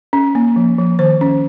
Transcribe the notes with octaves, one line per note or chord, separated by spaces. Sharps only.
C#4
A#3
F3
F3
D#3 C5
C#4